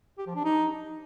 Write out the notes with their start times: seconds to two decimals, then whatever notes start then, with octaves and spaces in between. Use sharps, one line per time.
0.18 G4
0.27 F3
0.36 D4
0.44 D#4